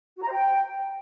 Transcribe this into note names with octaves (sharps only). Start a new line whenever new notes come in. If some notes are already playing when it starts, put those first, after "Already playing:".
F#4
A#5
C5
G5